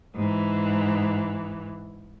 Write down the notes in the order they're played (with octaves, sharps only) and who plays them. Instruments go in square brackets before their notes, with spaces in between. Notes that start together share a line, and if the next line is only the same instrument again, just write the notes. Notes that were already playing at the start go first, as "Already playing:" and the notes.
[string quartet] G#2 E3